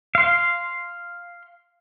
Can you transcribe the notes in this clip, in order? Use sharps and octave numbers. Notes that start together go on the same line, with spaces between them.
F5 C6